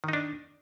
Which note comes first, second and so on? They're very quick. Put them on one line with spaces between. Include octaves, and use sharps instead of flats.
D#3 D#4 D4